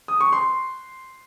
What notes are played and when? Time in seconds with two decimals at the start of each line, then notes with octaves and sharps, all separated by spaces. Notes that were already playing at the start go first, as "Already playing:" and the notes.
0.08 D#6
0.21 C#6
0.32 C6